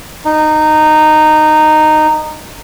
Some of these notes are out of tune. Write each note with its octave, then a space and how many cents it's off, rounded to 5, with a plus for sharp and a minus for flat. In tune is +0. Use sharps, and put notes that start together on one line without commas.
D#4 -15